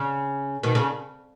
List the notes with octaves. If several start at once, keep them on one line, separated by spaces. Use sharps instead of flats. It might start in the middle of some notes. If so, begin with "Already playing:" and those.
Already playing: C#3
B2 D#3
C#3